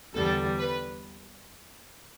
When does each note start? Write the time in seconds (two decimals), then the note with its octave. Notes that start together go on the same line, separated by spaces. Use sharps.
0.15 E2 D3 G3 A4
0.59 B4